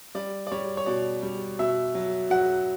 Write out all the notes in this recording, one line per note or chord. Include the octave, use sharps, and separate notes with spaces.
G3 D5
D5
G3 C#5
C#5
B2 D5
G3
B2 E5
F#3
F#3 F#5